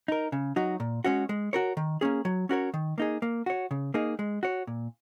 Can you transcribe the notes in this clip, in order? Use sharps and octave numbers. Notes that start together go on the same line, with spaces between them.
D#4 A#4
C#3
F#3 D#4 F#4
A#2
G#3 C#4 F#4 C#5
G#3
F#4 A#4 C#5
D#3
A#3 C#4 G#4
F#3
C#4 F#4 A#4 C#5
D#3
A#3 D#4 G#4
A#3
F#4 C#5
C#3
A#3 D#4 G#4
G#3
F#4 C#5
A#2